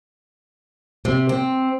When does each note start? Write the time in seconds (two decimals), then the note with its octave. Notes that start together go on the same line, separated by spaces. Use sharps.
1.05 C3
1.29 C4